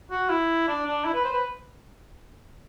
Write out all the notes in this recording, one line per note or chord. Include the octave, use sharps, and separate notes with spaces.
F#4
E4
D4
D4
E4
B4
C5
B4